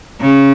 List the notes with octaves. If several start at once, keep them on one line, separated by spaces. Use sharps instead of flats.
C#3